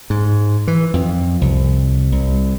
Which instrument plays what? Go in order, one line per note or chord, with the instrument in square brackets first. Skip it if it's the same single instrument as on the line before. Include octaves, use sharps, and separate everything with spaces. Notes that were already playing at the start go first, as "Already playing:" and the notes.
[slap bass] G#2
E3
F2
C2
C2